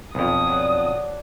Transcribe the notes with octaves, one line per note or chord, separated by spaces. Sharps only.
B1 F2 D#6
F#3 C4 D4